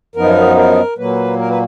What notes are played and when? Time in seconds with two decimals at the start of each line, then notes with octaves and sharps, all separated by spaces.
0.15 F#2 F3 B3 D#4 A#4
0.57 A#4
0.98 A#2 F#3 A#3 B4
1.39 A#4
1.49 B4